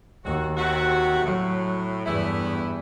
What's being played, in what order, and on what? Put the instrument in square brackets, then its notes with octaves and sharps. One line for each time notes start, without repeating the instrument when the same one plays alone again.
[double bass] D#2 [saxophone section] F#4
[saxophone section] C3 C4 F#4
[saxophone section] A2 [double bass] F#3
[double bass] E2 G2 [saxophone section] A3 B3 E4